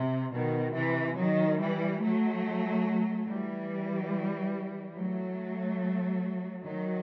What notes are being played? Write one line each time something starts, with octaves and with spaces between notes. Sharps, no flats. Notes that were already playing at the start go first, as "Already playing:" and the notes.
Already playing: C3
B2 D#3
C3 E3
D#3 F#3
E3 G3
F#3 A3
E3 G3
F#3 A3
D#3 F#3